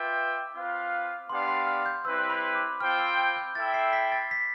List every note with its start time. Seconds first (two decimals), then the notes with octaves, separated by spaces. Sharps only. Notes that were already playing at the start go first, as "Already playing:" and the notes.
Already playing: F4 B4 E5 G5 D6
0.55 C4 F4 B4 F5
1.29 B3 D4 G4 D5 F5 C6
1.48 C6
1.67 F6
1.86 G6
2.05 G3 C4 E4 B4 E6
2.30 B5
2.55 D6
2.80 C4 F4 C5 G5 F6
2.99 E6
3.18 F6
3.37 G6
3.55 E4 A4 E5 G5 A6
3.74 C7
3.93 B6
4.12 A6
4.31 B6